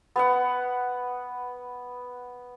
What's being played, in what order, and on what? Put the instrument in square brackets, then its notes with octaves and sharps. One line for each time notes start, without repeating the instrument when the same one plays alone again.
[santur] B3 B4 F#5